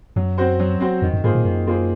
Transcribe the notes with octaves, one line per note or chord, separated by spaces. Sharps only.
F#2 F#3
C4 F#4 C5
F#3
C4 F#4 C5
F2 D#3
F#2
G#2 A#3 F4 G#4 C5
A#2
F#2 D#3
A#3 F4 G#4 C5